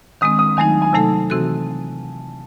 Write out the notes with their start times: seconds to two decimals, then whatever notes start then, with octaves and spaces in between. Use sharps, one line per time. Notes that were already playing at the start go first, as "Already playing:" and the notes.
0.21 D#3 G#3 C4 D#6
0.39 D#6
0.57 D#3 F#3 A3 D#4 G#5
0.82 G#5
0.93 C3 F#3 A3 D#4 A4 A5
1.30 C3 E3 C4 F#4 A4